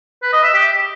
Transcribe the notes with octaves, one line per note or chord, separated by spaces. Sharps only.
B4
D#5
E5
G4